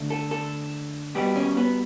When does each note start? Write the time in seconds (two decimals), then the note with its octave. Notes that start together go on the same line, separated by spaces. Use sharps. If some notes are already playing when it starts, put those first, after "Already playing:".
Already playing: D3 A3
0.10 A4
0.31 A4
1.15 B2 G3 B3 G4
1.36 C#4
1.57 B3